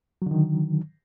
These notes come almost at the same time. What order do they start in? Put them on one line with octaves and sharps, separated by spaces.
F#3 D3 D#3